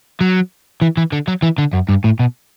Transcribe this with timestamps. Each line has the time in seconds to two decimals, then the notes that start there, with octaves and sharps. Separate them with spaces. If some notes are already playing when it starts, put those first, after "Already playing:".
0.21 F#3
0.82 E3
0.97 E3
1.12 D3
1.28 F#3
1.42 E3
1.58 D3
1.73 F#2
1.89 G2
2.04 A2
2.20 B2